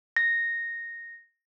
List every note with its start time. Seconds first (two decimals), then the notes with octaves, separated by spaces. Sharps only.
0.16 A#6